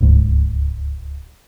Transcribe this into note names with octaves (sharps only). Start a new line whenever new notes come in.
D1 C#2 G#2